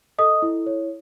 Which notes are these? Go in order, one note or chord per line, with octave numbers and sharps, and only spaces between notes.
A4 D#5 D#6
E4
C#5